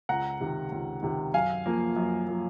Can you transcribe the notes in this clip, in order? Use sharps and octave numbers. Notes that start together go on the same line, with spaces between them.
C#2 F#5 A#5
C3 D#3
C#2
C3 D#3
F#2 F5 G#5
F3 A#3
F#2
F3 A#3